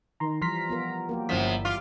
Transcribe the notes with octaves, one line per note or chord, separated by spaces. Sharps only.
D#3 A#5 C6
E3 F3 G3 A#5 C6 F6 B6
B3 F4 A#4
F#3 A#3 G4 A#4
G1 F#2 F3 G3 E4 B6
F4 D6